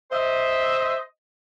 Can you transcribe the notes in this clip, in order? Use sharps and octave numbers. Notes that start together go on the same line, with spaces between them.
C5 D#5 E5